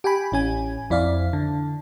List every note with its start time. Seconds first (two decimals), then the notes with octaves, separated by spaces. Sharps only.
0.04 G4 G5 G#5 B5
0.32 A1 C#4 G#5
0.90 F2 E4 D5 F5
1.33 D3